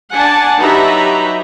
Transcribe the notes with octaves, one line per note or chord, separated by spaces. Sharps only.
D4 F#5 G#5 A5
F#3 D#4 G4 B4 E5 A#5